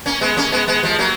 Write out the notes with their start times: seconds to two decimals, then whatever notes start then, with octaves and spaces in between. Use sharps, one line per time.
0.06 A#3 C#4
0.21 G#3 B3
0.37 A#3 C#4
0.52 G#3 B3
0.67 G#3 B3
0.83 F3 G#3
0.99 F#3 A#3